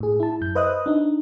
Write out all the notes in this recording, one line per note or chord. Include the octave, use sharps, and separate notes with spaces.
A2 G#4
E4 A5
F#2 G6
B4 C5 D#5 E5 D#6 F#6
D4 D#4